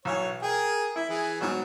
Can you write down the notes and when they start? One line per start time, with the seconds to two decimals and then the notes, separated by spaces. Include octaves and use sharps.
0.05 B1 E3 C#5
0.42 G#4 A#4 G5
0.96 E4 E5
1.09 E3 G#4
1.41 G#2 B2 F#3